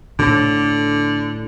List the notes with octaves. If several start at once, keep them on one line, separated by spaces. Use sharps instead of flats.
A2 D3